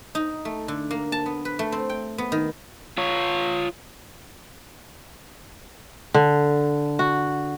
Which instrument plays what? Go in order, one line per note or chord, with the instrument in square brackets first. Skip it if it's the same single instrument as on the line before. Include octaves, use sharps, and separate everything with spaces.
[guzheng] D#4
A3
D3
A#3
A5
B3
B4
A3
C4
G5
B3
D#3
[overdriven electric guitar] F4 C#5
[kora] D3
F#4